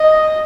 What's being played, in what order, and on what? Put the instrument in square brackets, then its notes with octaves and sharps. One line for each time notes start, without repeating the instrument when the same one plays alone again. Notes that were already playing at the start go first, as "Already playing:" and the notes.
Already playing: [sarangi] D#5